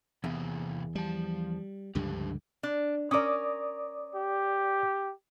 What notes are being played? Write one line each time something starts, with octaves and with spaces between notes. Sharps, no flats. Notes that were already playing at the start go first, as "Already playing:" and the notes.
E2 C3 A#3 G#4
F3 G3 A5
C#2 G2 D3 F3 D4 G4
D4
C#4 A#4 D5 D6 D#6
G4